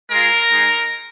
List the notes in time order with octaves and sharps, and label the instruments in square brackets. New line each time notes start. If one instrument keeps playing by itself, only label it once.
[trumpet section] G#3 F4 A#4
G#3 D#4